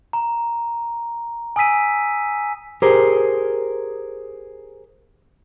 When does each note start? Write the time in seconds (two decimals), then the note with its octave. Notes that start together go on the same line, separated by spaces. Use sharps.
0.13 A#5
1.56 G#5 D#6 E6 B6 D#7
2.82 G4 G#4 A#4 C5